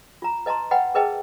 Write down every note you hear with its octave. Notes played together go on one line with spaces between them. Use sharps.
F4 A#5
B4 D#5 A5 A#5 C6
B4 D#5 F#5 G5 B5
G#4 A#4 B4 D#5 G5 A5